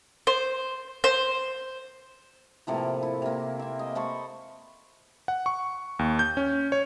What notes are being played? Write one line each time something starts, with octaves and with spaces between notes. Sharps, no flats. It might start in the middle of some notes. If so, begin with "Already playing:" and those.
C5
C5
A2 C3 F3 A#3
E4
C3 A#3
C4 E5
D#5 G#5
C5 A5 B5 C#6
F#5
C#6
D#2
G6
C#4
C#5